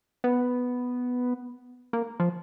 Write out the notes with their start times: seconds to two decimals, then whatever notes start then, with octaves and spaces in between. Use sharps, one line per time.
0.24 B3
1.93 A#3
2.20 F3